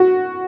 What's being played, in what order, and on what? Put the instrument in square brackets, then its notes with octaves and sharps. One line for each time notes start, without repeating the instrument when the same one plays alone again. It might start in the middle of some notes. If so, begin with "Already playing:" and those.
Already playing: [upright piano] F#4